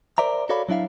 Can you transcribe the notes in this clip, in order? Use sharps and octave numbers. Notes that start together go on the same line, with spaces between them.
A#4 C5 D5 E5 A#5
F#4 A4 C#5 D5 F5 B5
F#3 D4 E4 E5 F5